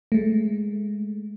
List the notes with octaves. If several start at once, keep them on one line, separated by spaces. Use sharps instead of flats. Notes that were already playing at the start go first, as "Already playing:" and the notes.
G#3 A3